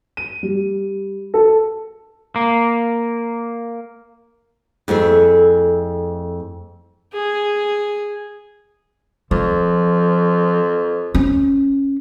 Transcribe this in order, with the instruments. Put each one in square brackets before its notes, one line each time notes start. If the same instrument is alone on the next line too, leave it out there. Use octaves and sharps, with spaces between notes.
[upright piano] D#7
G3
A4
[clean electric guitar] A#3
[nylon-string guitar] F2 A3 E4 G#4
[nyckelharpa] G#4
[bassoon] F2 [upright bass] F3
[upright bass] C#4